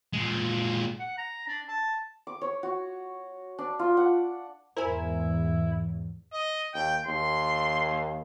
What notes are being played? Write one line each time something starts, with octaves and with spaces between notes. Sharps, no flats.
A#2 G#3
F#5
A#5
D4
A5
D6
C#5
F#4
D4
F4
F#5
E2 G#2 E4 A#4 C5 G#5
D#5
D#2 G5
D#2 C6